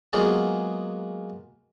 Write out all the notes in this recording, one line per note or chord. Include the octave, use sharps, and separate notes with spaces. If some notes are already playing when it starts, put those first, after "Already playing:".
F#3 G#3 A#3 B3 F4 G#4